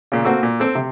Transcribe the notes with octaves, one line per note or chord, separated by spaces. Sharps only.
A#2 C#3
A#3 C4 F#4 A4
A#2
C4 A4
C3